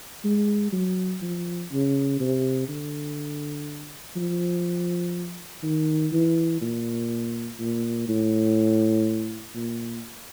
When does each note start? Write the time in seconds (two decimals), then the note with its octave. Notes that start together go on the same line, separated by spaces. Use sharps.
0.24 G#3
0.73 F#3
1.22 F3
1.72 C#3
2.20 C3
2.69 D3
4.16 F3
5.63 D#3
6.12 E3
6.61 A#2
7.59 A#2
8.08 A2
9.55 A#2